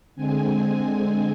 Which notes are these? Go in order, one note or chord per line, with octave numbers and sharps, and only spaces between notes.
D3 G#3 C4 G#5